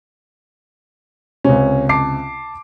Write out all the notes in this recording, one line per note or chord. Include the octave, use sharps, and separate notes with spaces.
C#2 C3 C#4
A5 D6 C7